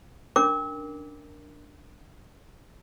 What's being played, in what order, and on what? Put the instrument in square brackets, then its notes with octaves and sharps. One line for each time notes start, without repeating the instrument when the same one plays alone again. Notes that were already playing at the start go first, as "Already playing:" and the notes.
[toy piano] C#4 D4 A#4 D6